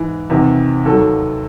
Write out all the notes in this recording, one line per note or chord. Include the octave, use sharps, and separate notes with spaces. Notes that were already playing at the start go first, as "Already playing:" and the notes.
Already playing: G#2 E3
E2 C3 D#3
D#2 D#3 F#3 A4